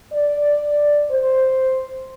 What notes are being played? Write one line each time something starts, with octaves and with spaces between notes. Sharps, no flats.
D5
C5